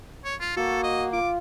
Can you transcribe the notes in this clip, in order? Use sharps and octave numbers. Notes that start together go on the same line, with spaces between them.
C#5
F4
A#3 F#4 A4
D#5
F4 D6